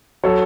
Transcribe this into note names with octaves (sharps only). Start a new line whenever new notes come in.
F#3 A4 C#5